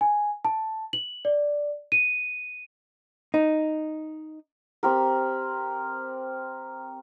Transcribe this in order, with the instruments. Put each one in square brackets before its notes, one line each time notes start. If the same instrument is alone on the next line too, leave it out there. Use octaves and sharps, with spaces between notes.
[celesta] G#5
A5
F#7
D5
D#7
[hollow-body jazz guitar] D#4
[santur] C4 G4 A#4